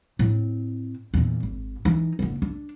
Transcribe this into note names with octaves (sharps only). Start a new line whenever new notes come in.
A2 C4
E2 A#2
G#1
E3 D#4
F#1 B3
D4